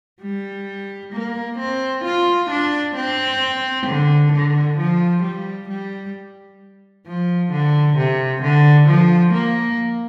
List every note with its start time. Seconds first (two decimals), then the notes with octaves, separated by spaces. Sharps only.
0.22 G3
1.13 A#3
1.59 C4
2.05 F4
2.51 D4
2.96 C4
3.87 D3
4.33 D3
4.78 F3
5.23 G3
5.69 G3
7.07 F3
7.52 D3
7.98 C3
8.43 D3
8.89 F3
9.34 A#3